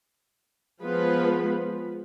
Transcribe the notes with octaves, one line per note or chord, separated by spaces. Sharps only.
F3 G#3 B3 F4 B4